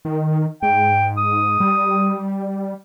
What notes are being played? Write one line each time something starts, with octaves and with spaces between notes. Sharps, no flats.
D#3
G#2 G5
D#6
G3